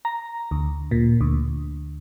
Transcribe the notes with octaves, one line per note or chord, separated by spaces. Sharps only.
A#5
D2
A#2
D2